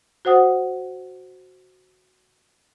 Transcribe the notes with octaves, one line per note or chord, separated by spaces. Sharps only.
F#4 C5 F#5 D#6